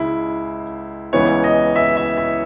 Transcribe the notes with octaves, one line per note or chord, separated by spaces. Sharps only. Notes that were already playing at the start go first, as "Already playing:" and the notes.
Already playing: C#2 C#3 G#3 E4
C#2 C#3 E3 B3 C#5
D#5
E5
E5
E5